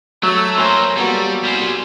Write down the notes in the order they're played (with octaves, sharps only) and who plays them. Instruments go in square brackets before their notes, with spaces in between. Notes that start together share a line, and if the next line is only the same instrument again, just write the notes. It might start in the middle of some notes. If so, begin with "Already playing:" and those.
[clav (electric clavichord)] F#3 [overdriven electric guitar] A3 [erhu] E6
[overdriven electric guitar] A#3 C5 [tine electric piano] C#5 G#5 C6 [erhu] A#5
[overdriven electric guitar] G3 [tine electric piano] A#3 B3 F#4 [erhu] A4
[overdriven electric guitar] G3 C5 [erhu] G#5